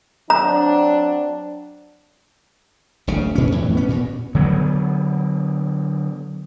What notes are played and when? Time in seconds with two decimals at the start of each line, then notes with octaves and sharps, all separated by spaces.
0.30 F#3 C4 D4 A#5
3.07 F#1 D2 C#3
3.35 A#2 C#4
3.52 F2 A2 E3
3.75 B3 C#4
3.88 G2 A#2
4.35 D3 F#3 A3 B3